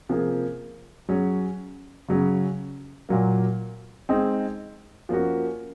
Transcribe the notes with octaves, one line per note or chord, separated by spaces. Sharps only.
C3 F3 A#3 F4 G#4
F#3 C#4 G#4
C#3 F#3 C#4 G#4
A#2 F#3 A#3
G#3 C4 D#4 G#4
F3 A#3 C#4 F#4